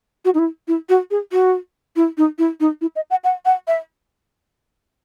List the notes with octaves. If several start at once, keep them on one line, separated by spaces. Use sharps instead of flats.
F#4
D#4
E4
E4
F#4
G#4
F#4
E4
D#4
E4
D#4
E4
D#5
F#5
F#5
F#5
E5